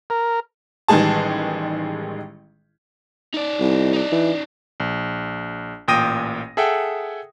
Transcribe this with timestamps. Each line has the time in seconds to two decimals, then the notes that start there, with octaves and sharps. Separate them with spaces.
0.10 A#4
0.88 A1 D#3 G3 G#3 G#4 A5
3.34 D#4 D5
3.60 C2
3.93 D#4 D5
4.12 E3
4.80 A#1
5.88 A1 A#2 G5 D#6 A#6 D#7
6.57 G#4 A4 E5 F#5 G5